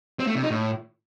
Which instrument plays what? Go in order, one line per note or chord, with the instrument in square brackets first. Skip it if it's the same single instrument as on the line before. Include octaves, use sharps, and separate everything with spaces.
[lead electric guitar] C4
A3
C3
D#4
A2